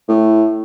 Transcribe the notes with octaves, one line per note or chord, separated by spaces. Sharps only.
A2